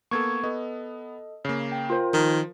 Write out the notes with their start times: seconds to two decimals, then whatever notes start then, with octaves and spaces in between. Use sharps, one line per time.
0.11 A#3 B3 A4 C#6 G#6
0.43 B3 A4 D#5
1.45 C#3 A#3
1.72 G5
1.90 F4 A#4 C5
2.14 D#3 F3